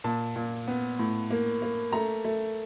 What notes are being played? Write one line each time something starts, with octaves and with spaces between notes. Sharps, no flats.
A#2 A5
A#2
B3
A2
A#3
A#3
A3 A#5
A3